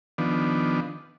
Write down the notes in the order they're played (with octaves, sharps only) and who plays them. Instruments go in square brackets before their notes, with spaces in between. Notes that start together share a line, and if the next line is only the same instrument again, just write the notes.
[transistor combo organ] D#3 F3 B3 D4